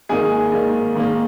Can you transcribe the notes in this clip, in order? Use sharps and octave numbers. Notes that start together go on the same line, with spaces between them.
G#2 D#3 A#3 G#4 G#5
G#2 D#3 A#3
G#2 D#3 A#3